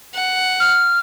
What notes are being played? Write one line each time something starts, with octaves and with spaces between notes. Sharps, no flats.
F#5
F6